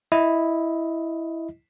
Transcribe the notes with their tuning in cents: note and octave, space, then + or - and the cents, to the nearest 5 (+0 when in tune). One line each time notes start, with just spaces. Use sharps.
E4 +0 D#5 +10